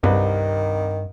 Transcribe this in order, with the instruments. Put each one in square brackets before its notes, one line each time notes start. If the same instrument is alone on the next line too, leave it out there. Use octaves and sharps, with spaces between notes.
[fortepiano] C2 B4 [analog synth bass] G2 [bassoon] D#3